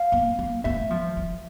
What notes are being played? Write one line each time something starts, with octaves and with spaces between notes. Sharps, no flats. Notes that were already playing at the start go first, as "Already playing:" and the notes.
Already playing: F5
A#3
A#3
A3 E5
F3
F3